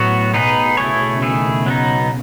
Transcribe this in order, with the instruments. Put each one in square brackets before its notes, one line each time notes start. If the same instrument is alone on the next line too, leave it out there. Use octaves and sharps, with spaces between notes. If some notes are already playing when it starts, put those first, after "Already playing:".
Already playing: [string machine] A2 [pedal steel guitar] F#3 B3 F#4
[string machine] B2 [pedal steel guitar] B3 D#4 G#4 B4
[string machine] C#3 [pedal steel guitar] A3 E4 G#4 C#5
[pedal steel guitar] D#3 A3 E4 G#4
F#3 B3 D#4